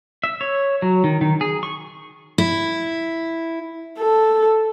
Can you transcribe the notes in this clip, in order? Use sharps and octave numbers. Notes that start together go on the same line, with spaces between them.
E5
C#5
F#3
D#3
D#3
G#4
C#6
E4
A4